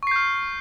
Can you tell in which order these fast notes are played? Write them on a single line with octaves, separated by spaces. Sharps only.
C#6 C7 G6 F6